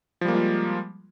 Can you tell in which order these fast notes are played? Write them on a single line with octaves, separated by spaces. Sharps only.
F3 G3 A#3 G#3 F4